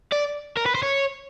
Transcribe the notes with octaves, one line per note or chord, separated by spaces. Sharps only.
D5
A#4
B4
C5
C#5